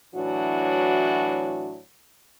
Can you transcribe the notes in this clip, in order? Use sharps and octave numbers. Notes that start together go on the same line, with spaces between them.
A2 E3 F#3 D4 F#4